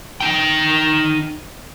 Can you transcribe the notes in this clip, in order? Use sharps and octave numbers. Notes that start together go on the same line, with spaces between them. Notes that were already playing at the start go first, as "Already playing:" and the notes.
D#4 G5